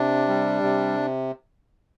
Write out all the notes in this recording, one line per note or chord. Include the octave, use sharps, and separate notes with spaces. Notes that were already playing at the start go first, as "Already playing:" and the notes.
Already playing: C3 D4
G3
C3